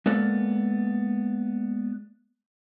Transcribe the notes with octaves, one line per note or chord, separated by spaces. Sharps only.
G#3 A#3 B3 A4 D5